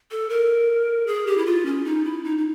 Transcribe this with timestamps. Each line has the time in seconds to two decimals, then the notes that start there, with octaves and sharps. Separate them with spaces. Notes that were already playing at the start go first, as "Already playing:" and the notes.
0.11 A4
0.30 A#4
1.07 G#4
1.27 G4
1.38 E4
1.46 F4
1.66 C#4
1.85 D#4
2.05 E4
2.24 D#4
2.38 D#4